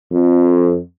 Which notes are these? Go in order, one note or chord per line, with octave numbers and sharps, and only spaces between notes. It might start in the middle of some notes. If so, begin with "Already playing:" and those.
F2